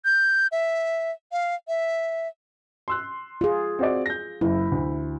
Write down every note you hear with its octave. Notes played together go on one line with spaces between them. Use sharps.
G6
E5
F5
E5
C6 E6 F#6
F4 G#4
C4 F#4 D5
G6 A#6
F#1 E4
D2